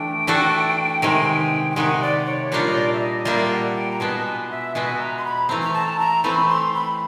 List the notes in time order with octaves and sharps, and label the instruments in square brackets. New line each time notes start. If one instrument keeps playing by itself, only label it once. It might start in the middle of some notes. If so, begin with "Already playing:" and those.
Already playing: [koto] E3 A3 D4 [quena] G5
[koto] E3 A3 D4 F#4 A4
C3 D#3 G#3
[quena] G5
[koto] C3 D#3 G#3 [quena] F#5
[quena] D5
C#5
[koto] A#2 G3 A#3 D4 F4 [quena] C#5
[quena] D#5
D5
E5
D#5
D#5
[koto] A#2 G3 A#3 D4 F4 [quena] E5
[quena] G5
F#5
G5
A#5
[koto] B2 G#3 B3 [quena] A5
[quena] G#5
E5
[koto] B2 G#3 B3 [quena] G#5
[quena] A#5
C6
B5
[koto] E3 A3 C4 [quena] A#5
[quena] A#5
A5
A#5
[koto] E3 A3 C4 [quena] B5
[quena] C6
B5